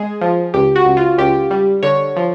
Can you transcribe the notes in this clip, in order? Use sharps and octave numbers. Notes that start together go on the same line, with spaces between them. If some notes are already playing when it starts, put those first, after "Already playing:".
Already playing: G#3 G#4
F3
C#2 G4
F#4
C#2
F4
C#2 G4
G3
D3 C#5
F3